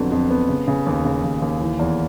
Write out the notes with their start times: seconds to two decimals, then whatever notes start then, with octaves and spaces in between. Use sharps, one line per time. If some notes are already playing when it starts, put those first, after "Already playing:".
Already playing: F2 D3 F#3 B3
0.12 F2
0.30 B3
0.49 C#3
0.68 C#3
0.86 D#2
1.05 C#3
1.23 D#2
1.42 D#2
1.61 E3
1.79 E2